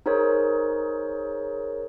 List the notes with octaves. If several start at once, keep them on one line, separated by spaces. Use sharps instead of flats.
D#4 G#4 A#4 C5 C#5